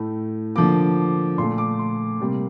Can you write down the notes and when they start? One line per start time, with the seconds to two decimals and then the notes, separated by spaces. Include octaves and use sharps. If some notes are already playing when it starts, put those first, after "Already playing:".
Already playing: A2 A3
0.56 D3 F3 A#3 D6
1.38 A#2 A3 C6
1.58 D6
1.79 C6
2.20 C3 G3 A#3